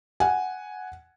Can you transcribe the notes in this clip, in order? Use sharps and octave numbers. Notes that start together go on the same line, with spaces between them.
F#5 G#5